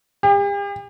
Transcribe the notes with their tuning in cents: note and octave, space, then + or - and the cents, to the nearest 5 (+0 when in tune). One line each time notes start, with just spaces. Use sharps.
G4 +40